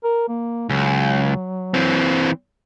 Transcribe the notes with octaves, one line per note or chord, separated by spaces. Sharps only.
A#4
A#3
C#2 F#3
E3 C4